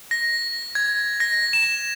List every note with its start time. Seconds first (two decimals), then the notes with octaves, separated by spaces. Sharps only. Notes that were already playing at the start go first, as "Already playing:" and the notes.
0.11 A#6
0.75 G#6
1.20 A#6
1.53 E7